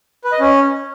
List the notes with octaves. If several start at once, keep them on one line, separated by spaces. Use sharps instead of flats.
B4
D#5
C#4